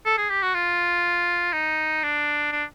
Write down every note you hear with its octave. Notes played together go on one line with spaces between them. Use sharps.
A4
G#4
G4
F#4
F4
D#4
D4
D4